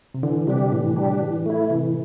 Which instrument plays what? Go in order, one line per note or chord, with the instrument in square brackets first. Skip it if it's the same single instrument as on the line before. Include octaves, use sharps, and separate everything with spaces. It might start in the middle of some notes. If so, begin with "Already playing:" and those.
[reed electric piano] C3
[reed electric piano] D3 [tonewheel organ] E3
[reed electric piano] C3 [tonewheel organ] G3 D4 G4
[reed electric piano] A2 [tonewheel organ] E3
[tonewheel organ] G3 D4 G4
E3
A3 E4
[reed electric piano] C3 [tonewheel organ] E3